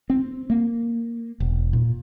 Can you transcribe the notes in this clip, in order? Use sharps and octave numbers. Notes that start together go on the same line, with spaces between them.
C4
A#3
E1
A#2